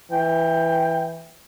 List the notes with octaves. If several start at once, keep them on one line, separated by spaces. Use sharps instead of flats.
E3 G5